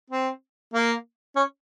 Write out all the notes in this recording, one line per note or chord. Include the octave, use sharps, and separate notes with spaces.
C4
A#3
C#4